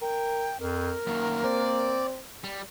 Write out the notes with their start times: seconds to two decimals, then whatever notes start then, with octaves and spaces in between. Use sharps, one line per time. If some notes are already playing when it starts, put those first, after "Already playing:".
0.02 A#4 G5
0.60 F2 A#4
1.07 F#2 D#3 A#3
1.44 C4 D5
2.44 G3